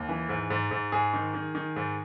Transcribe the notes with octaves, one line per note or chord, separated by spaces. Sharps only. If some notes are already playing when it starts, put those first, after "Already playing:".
Already playing: D#2
E3
G#2
G#2
G#2
G#2 G#4
D#3
D#3
D#3
G#2